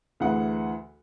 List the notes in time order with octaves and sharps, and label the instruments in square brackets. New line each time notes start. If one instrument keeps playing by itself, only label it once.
[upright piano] D2 E3 G#4 F#5